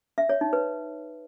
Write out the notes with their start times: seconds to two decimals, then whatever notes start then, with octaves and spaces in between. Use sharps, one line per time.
0.18 E5
0.29 C#5
0.41 D#4
0.53 B4